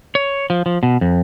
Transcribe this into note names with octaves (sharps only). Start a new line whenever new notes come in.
C#5
F3
F3
B2
F2